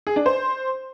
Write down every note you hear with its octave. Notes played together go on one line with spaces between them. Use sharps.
G#4
D4
C5